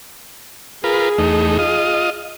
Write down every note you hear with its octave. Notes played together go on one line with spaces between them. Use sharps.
F4 G#4 A#4 B4
E2 A3 D#4
F4 D#5